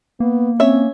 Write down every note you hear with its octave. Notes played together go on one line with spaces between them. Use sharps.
A#3 B3
C4 C#4 C#5 E5